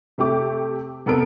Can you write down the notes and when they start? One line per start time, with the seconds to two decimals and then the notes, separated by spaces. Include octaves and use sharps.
0.18 C3 A3 G4 D6
1.06 C3 B3 A4 A#4 D7